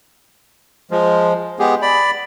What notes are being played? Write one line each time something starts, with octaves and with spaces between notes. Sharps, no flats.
F3 G#3
G#3 B3 G4 G#4
D5 B5